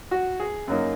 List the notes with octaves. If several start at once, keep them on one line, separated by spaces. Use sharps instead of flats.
F#4
G#4
F#2 F#3 A#3 D#4